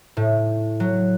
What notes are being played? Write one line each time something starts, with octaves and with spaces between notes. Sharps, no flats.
A2
F#3